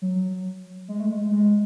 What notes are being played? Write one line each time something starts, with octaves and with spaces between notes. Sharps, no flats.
F#3
G#3
A3
G#3
G#3